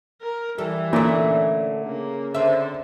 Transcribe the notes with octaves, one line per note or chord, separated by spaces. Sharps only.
A#4
E3 G3 A4
A#2 D3 A3 C#4
C#3 A#3
D3 C4 E5